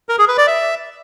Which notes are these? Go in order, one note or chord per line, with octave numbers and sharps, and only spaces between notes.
A#4
G#4
B4
D5
E5